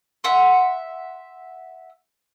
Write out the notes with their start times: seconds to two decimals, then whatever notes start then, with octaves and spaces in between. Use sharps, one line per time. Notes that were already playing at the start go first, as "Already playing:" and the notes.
0.24 E5 F#5 C6